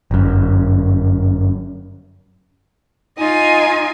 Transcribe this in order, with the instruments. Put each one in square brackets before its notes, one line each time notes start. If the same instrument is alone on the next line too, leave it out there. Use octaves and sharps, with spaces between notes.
[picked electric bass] G1 F#2
[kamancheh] D#4 G#5 [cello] F4 D#5